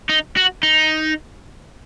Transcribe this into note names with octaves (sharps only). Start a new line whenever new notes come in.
D#4
F#4
D#4